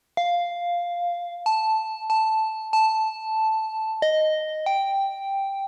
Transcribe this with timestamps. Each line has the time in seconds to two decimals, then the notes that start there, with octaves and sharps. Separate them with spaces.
0.17 F5
1.46 A5
2.10 A5
2.73 A5
4.02 D#5
4.66 G5